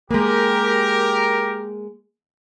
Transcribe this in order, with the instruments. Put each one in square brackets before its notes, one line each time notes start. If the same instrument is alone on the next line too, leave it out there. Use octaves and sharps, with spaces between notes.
[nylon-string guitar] G#3 A#3 [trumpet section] G4 A#4